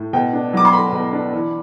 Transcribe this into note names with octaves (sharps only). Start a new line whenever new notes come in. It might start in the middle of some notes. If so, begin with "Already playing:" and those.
Already playing: A2
B2 G5
D4
F#3 D6
C6
A3 B5
B2
D4
E3